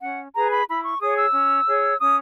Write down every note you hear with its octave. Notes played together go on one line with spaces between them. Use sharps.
C#4 F#5
G#4 B4 A#5
B5
E4 B5
C#6
G#4 C#5 D#6
E6
C#4
G#4 C#5
C#4 D#6